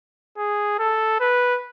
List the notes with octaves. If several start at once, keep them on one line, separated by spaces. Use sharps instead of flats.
G#4
A4
B4